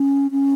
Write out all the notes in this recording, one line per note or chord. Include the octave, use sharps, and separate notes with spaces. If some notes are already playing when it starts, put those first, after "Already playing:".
Already playing: C#4
C#4